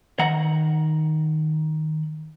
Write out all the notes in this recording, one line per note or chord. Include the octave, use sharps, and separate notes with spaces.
D#3 F#5 A#5